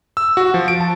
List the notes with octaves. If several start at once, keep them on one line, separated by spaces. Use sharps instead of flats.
E6
F#4
F3
D7
A5